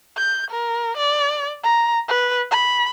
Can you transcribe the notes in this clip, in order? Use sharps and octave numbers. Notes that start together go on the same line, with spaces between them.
G6
A#4
D5
A#5
B4
B5